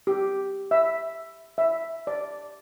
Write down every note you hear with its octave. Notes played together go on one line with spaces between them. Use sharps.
G4
E5
E5
D5